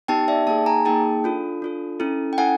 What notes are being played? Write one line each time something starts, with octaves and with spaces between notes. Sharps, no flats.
B3 D#4 G4 G5 A5
D5 E5
A#3 D#4 G#4 G5 A5
G#5 A#5
A#3 D#4 G#4 G5 A5
D4 F4 A4
D4 F4 A4
C#4 E4 A4
G5
C#4 E4 A4 F#5 G#5